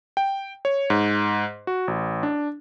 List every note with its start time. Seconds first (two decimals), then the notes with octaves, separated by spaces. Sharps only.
0.17 G5
0.65 C#5
0.90 G#2
1.67 F#4
1.88 A1
2.23 D4